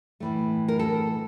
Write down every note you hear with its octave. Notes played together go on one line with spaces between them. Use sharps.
A2 E3 A3
A#4
A4